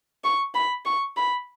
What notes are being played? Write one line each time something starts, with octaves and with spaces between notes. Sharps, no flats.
C#6
B5
C#6
B5